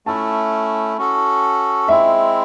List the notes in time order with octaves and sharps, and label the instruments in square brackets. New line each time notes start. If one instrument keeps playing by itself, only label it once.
[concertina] A3 C#4 E4 [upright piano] A5
[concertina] C#4 F#4 A4
[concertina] G#3 C4 E4 [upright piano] E5